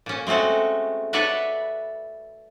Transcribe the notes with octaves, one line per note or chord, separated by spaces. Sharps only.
A#2 C#4
G#3 A3 C4 C#4 F#4
A4 B4 C#5 D5 E5 F#5